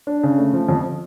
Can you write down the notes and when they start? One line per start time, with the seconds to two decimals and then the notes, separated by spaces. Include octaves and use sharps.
0.07 D4
0.23 C#3
0.38 A3
0.53 F3
0.69 F2